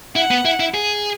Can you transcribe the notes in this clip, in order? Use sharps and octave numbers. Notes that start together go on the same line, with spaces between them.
E4 F#5
B3
E4
E4
G#4